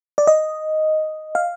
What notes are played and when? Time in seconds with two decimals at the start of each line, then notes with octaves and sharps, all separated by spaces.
0.18 D5
0.27 D#5
1.35 F5